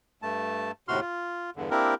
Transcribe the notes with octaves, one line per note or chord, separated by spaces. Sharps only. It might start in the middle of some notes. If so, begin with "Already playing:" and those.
G2 A3 A5
D#2 A2 C3 F#4 C6 F6
F4
E2 G2 D3
A#3 C4 D4 E4 G4 A#4